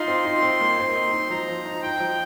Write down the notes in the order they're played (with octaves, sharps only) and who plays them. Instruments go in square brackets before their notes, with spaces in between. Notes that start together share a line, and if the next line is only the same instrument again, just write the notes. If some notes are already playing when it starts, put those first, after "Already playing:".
Already playing: [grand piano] D#4 F4 [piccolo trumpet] C6
[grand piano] C4
D#4
C4
A#3
C4
D#4
D#4
[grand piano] F3 [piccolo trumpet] A#5
[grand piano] F3
D#4
[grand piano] D#4 [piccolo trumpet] G5
[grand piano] F3